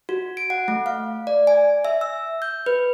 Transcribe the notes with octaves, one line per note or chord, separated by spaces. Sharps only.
F#4
D7
F#5
A3
F5
D5
G#5
E5
E6
G6
B4